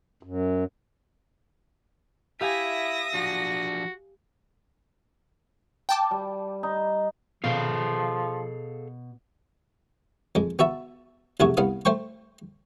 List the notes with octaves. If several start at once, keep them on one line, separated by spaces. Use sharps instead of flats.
F#2
E4 G4 E5 F5 G#5 D#6 A#6
F3 D4 F#4
G5 A5 D6
G3
D#4
B2 F3 G#4 A4 F5
F2 G#3
B3 F#4 E5 A5
B1 F2 C3 A3 F#4 G#4
C2 B3 F5 D#6
A3 C5 G5 C#6